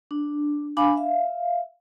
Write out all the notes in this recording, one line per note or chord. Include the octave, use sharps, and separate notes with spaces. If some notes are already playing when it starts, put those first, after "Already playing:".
D4
D4 F5 G#5 B5 D6
E5 F5